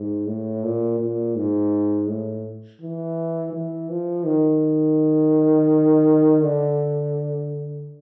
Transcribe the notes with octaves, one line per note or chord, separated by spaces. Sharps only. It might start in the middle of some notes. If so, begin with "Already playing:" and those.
Already playing: G#2
A2
A#2
A#2
G#2
A2
E3
E3
F3
D#3
D3